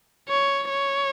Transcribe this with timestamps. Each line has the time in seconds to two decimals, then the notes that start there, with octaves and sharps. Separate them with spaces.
0.29 C#5
0.70 C#5